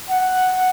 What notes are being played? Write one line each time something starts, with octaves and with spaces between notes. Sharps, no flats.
F#5